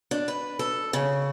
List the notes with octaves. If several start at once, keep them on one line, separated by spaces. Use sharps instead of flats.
D4
B4
A4
C#3